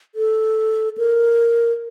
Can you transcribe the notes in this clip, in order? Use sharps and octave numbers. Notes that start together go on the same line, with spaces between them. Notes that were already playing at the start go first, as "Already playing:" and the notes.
A4
A#4